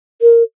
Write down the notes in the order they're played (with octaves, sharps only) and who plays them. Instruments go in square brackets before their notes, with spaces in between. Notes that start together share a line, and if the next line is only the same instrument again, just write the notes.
[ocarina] A#4